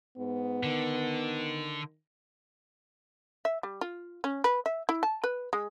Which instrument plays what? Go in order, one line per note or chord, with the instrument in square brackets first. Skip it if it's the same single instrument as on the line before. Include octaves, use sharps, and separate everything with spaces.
[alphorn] G#2 [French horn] B3
[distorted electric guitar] D3 [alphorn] D#3
[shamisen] E5
G3
F4
C#4
B4
E5
E4
A5
B4
G#3